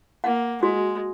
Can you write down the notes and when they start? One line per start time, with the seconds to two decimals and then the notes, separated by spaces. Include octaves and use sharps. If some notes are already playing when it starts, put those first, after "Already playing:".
0.24 A#3 F#5
0.62 G#3 F#4